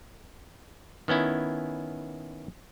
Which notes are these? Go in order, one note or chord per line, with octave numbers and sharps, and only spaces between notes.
D#3 B3 C#4 E4